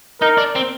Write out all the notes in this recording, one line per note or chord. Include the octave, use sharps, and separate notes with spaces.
D#4 A#4
D4
C4